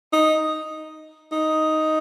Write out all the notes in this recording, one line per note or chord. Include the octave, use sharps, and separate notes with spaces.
D#4
D#4